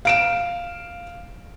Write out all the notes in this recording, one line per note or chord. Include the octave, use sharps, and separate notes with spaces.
F5 D7 E7